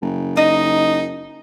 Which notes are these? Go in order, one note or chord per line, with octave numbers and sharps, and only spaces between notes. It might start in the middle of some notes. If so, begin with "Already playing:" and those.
F#1
D#4 D#5